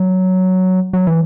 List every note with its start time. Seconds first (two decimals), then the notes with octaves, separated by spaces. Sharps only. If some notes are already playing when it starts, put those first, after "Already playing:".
Already playing: F#3
0.93 F#3
1.07 E3